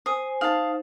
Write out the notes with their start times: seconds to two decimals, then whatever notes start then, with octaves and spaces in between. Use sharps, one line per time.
0.06 C5 G#5 D#6
0.41 D#4 C5 F5 A5